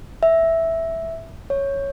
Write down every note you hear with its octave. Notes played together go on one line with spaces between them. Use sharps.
E5
C#5